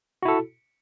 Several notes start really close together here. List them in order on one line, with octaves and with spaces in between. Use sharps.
F#4 E4 A4